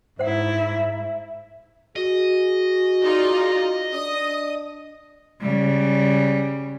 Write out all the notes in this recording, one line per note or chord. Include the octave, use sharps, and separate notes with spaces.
G#2 E4 C5 E5 F#5
F#4 G#4 D#5
D#4 F4 D5
D4 D#6
C#3 G3